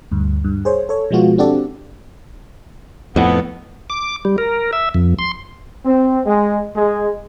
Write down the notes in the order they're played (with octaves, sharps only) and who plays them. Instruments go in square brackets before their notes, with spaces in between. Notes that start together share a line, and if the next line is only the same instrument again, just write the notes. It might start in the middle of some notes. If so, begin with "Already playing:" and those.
[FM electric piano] D2 G2
G2
G#4 C5 C#5
A4 C#5
B2 F3 G#3 B3 F4 F#4
C4 D4 F#4 G4 A4 D5
[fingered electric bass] F2 A2 [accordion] B3
[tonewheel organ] D6
G3
A#4
E5
F2
C6
[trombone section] C4
G#3
G#3